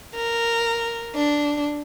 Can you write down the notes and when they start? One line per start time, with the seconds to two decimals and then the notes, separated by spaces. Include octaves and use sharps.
0.14 A#4
1.15 D4